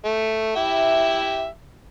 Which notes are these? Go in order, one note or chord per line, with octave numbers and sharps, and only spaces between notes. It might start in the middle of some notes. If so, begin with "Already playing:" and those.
A3
E4 G4 E5